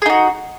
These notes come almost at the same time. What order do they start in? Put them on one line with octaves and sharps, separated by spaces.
G#4 D#4 F#4